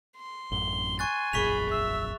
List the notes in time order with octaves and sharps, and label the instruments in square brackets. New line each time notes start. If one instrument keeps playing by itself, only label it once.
[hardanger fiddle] C6
[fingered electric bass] A1 F#2 [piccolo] G7
[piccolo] G#5 [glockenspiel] C#6 F#6 A6
[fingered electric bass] E1 A#1 F#2 [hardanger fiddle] G#4 B5 [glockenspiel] C#6 B6 F7
[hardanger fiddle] E5 [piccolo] E6